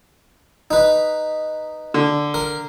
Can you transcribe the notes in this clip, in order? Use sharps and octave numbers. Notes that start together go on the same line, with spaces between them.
D#4 B4
D3
A#4